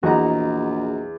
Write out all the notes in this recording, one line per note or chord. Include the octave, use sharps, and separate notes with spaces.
A#1 E2 F#4 D#5 A#5